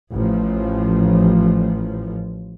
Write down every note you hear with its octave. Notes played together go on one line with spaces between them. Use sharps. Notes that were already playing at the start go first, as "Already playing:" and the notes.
A1 A2 F3